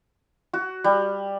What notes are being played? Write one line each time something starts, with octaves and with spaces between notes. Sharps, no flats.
F#4
G3